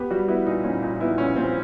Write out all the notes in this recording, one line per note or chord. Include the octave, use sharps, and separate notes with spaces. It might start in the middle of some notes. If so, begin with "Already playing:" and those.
Already playing: B3 G4
G3 F#4
B3 E4
A#2 D#4
A#2 C#4
A#2 D#4
B3 E4
A#2 C#4
A#2 C4